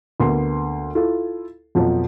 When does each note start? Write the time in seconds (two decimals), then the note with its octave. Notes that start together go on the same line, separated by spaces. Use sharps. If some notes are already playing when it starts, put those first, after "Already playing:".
0.20 D2 A#3 B3 C6
0.95 E4 F4 A4
1.75 F2 B2 F3 F#3